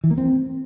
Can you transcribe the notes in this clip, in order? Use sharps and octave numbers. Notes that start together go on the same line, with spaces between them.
E3
A#3
C4